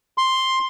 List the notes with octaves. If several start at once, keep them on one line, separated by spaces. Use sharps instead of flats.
C6